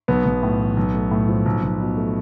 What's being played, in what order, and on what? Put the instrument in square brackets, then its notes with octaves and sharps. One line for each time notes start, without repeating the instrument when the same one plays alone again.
[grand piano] B1 B3
B1
A2
E3
B1
A3
A2
F3
B1
B1
B2
A3